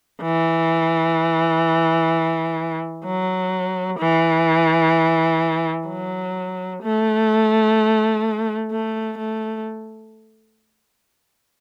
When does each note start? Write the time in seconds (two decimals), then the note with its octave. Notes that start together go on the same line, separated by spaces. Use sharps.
0.22 E3
3.05 F#3
3.99 E3
5.88 F#3
6.83 A3
8.71 A3
9.18 A3